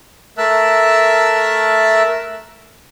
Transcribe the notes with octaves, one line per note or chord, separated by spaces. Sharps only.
A3 A#4 E5 A5 E6 F#6